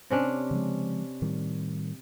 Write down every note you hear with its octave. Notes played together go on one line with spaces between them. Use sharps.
C3 C#4 D4
C#3 F3 G#3
A2 D#3 G3